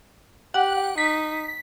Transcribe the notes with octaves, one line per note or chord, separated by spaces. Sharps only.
G4 F#5
D#4 B6